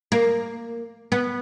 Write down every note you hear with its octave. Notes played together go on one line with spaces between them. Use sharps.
A#3
B3